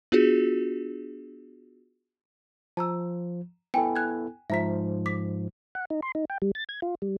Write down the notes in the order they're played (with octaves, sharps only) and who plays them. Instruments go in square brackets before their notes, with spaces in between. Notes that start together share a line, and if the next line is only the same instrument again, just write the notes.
[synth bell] B3 D4 F4 F#4 G#4
[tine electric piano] F3 [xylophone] A5 A#5 E6
[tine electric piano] B3 E4 A4 [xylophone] G5 G#5
[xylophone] G#5 F#6 G#6
[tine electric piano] G#2 F3 [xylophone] E5 A#5 B6
[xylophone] D6 B6
[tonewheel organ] F#5
D#4
C6
D#4
G5
G3
A6
G#6
F4
G3